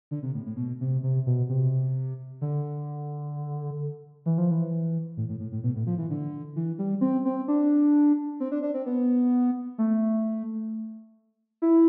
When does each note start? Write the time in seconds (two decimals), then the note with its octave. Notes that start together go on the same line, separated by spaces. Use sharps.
0.11 D3
0.23 C3
0.34 A2
0.46 A2
0.56 B2
0.81 C3
1.03 C3
1.26 B2
1.49 C3
2.41 D3
4.26 E3
4.38 F3
4.51 E3
5.17 A2
5.29 A2
5.40 A2
5.52 A2
5.64 B2
5.76 A2
5.87 F3
5.98 E3
6.10 D3
6.56 E3
6.79 G3
7.01 C4
7.25 C4
7.48 D4
8.40 C4
8.52 D4
8.63 D4
8.74 C4
8.86 B3
9.78 A3
11.62 E4